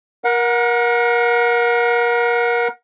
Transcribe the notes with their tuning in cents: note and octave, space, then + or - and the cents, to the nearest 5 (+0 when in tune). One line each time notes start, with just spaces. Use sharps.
A#4 +25 F#5 -25